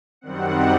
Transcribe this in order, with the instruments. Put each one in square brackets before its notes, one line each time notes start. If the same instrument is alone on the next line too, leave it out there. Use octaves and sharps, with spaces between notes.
[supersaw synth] F#2 D#3 G3 C4 F#5